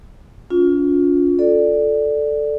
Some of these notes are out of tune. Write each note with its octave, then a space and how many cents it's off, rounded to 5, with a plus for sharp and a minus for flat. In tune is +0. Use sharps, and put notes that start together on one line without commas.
C#4 +45 F4 +20
A4 +0 D5 +5